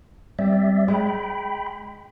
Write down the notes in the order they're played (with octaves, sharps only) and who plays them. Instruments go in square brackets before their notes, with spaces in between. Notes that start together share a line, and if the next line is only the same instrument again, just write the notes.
[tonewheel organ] G3 D5 E5 [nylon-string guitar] C4
[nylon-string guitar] G#3 [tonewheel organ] G5 B5